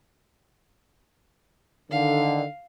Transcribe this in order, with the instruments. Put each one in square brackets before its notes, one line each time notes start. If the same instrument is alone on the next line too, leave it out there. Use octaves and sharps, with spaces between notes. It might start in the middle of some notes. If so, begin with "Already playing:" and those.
[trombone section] D3 D#3 [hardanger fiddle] F5